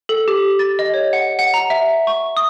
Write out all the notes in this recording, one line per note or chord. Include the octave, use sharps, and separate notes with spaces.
A4
G4
A6
D#5
C#5
F#5
F#5
A#5
E5
C#6
D#6